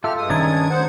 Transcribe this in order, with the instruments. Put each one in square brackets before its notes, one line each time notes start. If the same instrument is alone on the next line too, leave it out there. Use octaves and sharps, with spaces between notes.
[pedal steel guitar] F4 A4 E5 [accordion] G4 F6
[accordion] G2 G#3 D#6
[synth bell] D#3 G#6 [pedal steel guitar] C#4 D4 A5
[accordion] D2 C5 F#5